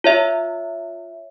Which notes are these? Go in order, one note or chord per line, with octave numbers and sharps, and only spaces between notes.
F4 C#5 E5